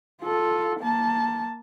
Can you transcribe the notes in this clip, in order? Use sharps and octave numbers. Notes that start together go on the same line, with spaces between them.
F4 A4
A#3 A5